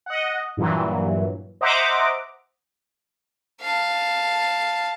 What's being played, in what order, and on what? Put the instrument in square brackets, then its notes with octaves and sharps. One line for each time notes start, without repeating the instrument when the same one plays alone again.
[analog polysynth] D#5 F#5
G2 A#2 E3 F#3
C5 D#5 E5 F#5 A#5 D6
[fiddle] F5 A5